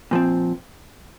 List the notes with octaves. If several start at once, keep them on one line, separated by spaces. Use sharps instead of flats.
A#2 F3 C4